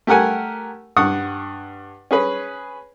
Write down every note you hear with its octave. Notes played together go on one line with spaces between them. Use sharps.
A3 G4 A#4 F#5 G#5
G2 F#5 C#6 D#6
C#4 G#4 B4